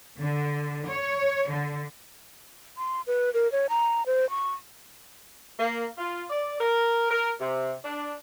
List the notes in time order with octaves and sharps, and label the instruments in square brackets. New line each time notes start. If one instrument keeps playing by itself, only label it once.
[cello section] D3
C#5
D3
[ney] C6
B4
A#4
C#5
A#5
C5
C#6
[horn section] A#3
F4
D5
A#4
A#4
C3
D4